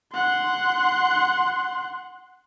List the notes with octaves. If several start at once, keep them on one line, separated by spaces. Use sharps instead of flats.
F#5 C6